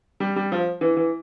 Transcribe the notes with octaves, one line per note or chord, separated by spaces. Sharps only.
G3
G3
F3
E3
E3